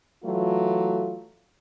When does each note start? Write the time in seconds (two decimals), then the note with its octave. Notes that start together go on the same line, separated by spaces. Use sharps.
0.24 E3 F#3 A3 F4